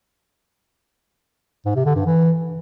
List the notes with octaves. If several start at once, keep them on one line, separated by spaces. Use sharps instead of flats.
G#2
C3
D3
G2
E3